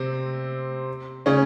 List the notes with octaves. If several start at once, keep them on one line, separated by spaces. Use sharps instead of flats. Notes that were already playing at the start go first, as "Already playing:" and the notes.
Already playing: C3 C4
C#3 C#4